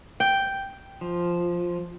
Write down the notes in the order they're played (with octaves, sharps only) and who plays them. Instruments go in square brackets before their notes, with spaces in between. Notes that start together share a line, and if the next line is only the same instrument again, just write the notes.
[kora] G5
[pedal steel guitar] F3